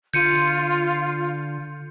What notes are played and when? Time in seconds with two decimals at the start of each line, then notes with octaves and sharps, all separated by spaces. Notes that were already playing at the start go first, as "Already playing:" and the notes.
0.14 D3 F4 G6 C#7 D#7